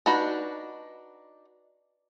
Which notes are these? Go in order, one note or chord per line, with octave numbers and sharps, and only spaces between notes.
D4 D#4 F#4 B4